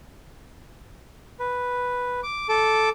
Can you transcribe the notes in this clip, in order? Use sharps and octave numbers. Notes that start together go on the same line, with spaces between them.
B4
D6
A4 D6